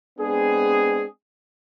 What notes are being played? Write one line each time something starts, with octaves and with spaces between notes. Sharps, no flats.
G#3 B3 C4 D4 G#4